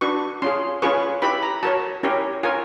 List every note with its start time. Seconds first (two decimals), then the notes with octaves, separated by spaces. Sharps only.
0.01 D4 F#4 B4 C#6
0.42 C#4 F4 G#4 C6
0.82 C#4 F4 G#4 B4 C#6
1.22 E4 G4 B4 B5
1.43 A#5
1.63 F#4 A#4 C#5 A5
2.03 C#4 E4 G4 A#4 C#5
2.43 F4 A#4 C#5 G#5